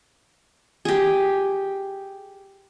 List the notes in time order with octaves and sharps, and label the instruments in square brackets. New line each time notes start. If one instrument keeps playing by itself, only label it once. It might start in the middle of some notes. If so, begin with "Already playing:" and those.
[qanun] G4 G#4